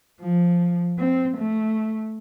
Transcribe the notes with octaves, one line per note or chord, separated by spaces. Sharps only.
F3
C4
A3